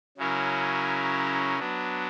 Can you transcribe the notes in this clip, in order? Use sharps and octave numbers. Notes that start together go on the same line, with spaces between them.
C#3 F#3 C#4 E4 A#4
F#3 B3 D4